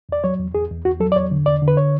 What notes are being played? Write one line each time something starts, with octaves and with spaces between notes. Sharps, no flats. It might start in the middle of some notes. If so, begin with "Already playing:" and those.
E2 D5
F#3 C#5
E2
E2 G#4
E2
E2 F#4
F#3 A4
D5
E2 C#5
D3
E2 D5
D3
B4
C#5